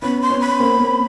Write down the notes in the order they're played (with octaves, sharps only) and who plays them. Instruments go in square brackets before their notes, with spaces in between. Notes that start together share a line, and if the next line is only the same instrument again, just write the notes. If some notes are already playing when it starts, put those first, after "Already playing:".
[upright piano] B3 C#4 [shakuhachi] B5
[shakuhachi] C6
[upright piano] B3 C#4
[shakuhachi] B5
[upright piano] A#3 C4
A#3 C4